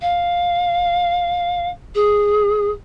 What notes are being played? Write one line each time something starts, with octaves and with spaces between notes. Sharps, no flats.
F5
G#4